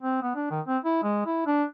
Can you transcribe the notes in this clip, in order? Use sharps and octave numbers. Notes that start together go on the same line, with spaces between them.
C4
B3
D4
D#3
C4
E4
G#3
E4
D4